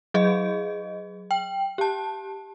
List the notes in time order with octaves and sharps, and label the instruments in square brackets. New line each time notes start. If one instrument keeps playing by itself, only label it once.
[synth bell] F#3 G#4 D#5
G5
G4 A5